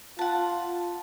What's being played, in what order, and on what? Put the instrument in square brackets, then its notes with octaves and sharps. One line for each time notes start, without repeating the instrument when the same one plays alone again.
[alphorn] F4 [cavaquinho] F#5 A5